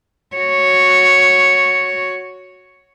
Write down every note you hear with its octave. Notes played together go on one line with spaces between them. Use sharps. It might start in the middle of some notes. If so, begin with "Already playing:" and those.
F#4 C#5